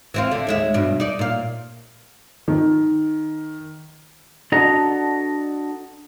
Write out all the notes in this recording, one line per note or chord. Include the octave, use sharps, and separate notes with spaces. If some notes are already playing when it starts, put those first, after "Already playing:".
E3 C4 F4
D3
D#2 G#3 E5
G2 B2
D#4 D5
A#2 F5
D#3
D4 F#4 A4 D#5 A5 A#5